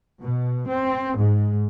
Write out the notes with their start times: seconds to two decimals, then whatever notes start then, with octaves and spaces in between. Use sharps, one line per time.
0.21 B2
0.69 C4
1.19 G#2